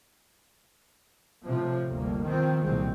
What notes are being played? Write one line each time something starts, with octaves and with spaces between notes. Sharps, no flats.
A2 C3 F3
G1 D2 A#3
D#3 F3 C4
C2 A#2 F#3 G#3 C4